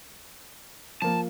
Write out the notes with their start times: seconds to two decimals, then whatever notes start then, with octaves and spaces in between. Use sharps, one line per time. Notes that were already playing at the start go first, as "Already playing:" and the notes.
1.02 F3 A#3 A5